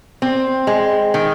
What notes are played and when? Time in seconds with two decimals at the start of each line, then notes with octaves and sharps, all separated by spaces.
0.22 C4
0.67 G#3
1.14 D#3